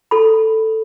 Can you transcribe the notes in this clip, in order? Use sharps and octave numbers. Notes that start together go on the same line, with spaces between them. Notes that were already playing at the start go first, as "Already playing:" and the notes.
A4 B5